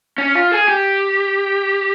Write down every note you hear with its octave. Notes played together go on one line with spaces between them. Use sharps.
C#4
F4
G#4
G4